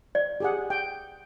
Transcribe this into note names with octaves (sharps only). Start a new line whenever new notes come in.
D5
G4 G#4 F#5
G5